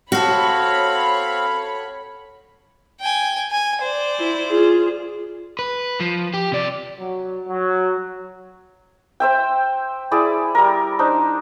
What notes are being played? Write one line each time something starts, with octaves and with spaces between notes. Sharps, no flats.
C4 F#4 A4 C#5 F5 B5
G5 G#5
G#5
C5 D5
E4
F4 G#4
B4
F3
G4
C3 D5
F#3
F#3
C5 E5 G5
E4 G#4 D5
G3 A#4
D4 D#4 C5